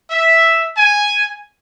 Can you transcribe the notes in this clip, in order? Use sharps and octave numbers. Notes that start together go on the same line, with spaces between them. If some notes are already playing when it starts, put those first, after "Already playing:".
E5
G#5